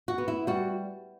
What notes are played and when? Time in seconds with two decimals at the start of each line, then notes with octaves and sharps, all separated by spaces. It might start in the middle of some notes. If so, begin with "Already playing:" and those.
0.08 F#4
0.18 B3
0.28 E4
0.47 G3 F#4